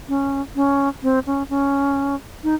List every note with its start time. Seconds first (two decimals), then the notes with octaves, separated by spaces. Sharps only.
0.09 C#4
0.56 C#4
1.03 C4
1.27 C#4
1.50 C#4
2.44 D#4